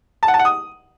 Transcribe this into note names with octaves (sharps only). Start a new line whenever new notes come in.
A5
F#5
A5
F#5
D#6